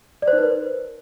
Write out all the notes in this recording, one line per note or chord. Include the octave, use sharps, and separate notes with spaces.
D5
C5
D#4
B4
A#4